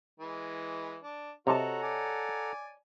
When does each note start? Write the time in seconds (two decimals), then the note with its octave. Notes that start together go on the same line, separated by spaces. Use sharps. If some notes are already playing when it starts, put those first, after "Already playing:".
0.20 E3 G#3
1.03 D4
1.47 C3 F#4 A4 C#5 D#5 F#5 A5 A#5
1.82 D5 G#5